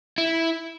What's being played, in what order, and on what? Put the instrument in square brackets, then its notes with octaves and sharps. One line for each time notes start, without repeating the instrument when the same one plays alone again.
[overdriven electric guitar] E4